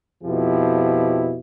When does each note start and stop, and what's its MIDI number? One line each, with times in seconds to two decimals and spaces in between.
0.24 1.37 41
0.24 1.37 47
0.24 1.37 53
0.24 1.37 64
0.24 1.37 67